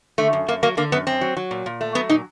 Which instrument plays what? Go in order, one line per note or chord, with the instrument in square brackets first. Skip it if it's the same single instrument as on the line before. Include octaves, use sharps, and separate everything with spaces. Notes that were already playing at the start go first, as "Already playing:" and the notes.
[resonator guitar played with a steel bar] D3 A3
F#2
F#2 A#3
F#3 A#3
D3 A#3
F#2 B3
F#2 C4
F#3
F#3
A#2
A#2
A3
F#3 B3
A#2 D#4